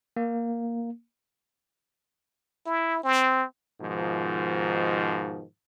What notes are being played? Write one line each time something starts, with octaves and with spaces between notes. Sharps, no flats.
A#3
E4
C4
G#2 B2 D#3 F3